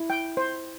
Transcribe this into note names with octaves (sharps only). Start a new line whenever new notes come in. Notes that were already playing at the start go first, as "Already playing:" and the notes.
Already playing: E4
G5
C5